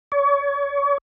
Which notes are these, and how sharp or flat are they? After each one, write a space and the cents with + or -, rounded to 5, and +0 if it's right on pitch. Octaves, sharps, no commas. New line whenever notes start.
C#5 +35